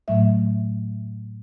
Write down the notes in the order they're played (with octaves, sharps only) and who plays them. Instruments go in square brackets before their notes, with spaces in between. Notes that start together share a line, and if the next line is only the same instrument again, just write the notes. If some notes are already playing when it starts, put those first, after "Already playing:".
[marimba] A2 F#3 A3 E5